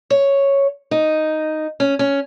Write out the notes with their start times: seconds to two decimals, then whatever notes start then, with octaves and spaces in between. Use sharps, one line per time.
0.10 C#5
0.91 D#4
1.80 C#4
1.99 C#4